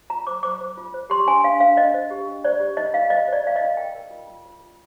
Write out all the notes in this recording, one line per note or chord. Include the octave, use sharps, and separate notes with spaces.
F4 A#5
C5 D6
C5 D6
C5
F4
C5
G4 C6
D4 G#5
D4 F5
D4 F5
D4 D#5
C5
G4
D4
C5 D5
G4
D#4 D#5
D#4 F5
C5 D#5
C5 D5
C5 F5
D#4 D#5
A#4 G5
A#4
F4
F4
F4
F4